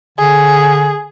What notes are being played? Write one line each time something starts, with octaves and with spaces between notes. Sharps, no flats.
D3 G#4